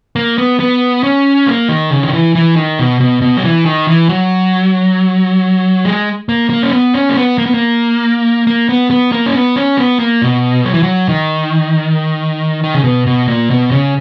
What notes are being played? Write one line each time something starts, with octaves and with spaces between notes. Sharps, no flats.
A#3
B3
B3
C#4
A#3
D#3
C#3
D#3
E3
E3
D#3
B2
B2
B2
F#3
E3
D#3
E3
F#3
G#3
A#3
A#3
C#4
B3
C#4
A#3
B3
A#3
B3
A#3
A#3
B3
B3
A#3
C#4
B3
C#4
B3
A#3
B2
F#3
E3
F#3
D#3
D#3
C#3
B2
B2
A#2
B2
C#3